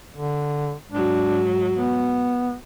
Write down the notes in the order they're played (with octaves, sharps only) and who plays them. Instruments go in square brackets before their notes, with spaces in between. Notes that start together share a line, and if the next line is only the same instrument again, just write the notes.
[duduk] D3
[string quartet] G#2 F#3 [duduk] D4
[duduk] B3